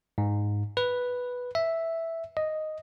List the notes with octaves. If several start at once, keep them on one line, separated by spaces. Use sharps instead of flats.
G#2
B4
E5
D#5